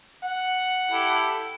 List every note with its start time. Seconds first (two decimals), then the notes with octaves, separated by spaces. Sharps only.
0.24 F#5
0.91 E4 G4 A4